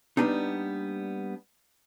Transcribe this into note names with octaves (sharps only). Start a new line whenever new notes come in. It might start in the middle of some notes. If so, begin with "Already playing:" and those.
G3 A#3 B3 D4 D#4